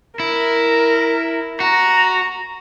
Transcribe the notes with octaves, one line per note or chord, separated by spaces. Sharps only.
E4 A#4
F#4 A#5